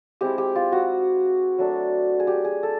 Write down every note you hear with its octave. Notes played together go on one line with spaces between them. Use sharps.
G#3 C4 E4 G4
G4
F4
F#4
F#3 A3 D4
G#4
G4
G#4
A4